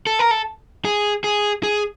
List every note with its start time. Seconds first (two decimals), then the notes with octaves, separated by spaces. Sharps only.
0.07 A4
0.19 A#4
0.31 A4
0.85 G#4
1.24 G#4
1.63 G#4